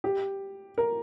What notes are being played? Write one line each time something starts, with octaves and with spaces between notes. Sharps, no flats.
G4
A#4